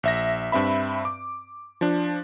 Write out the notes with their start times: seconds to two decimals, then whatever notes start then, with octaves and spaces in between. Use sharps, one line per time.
0.03 A#1 E5 A#6
0.52 G2 C4 E5 B5
1.05 D6
1.81 F3 D4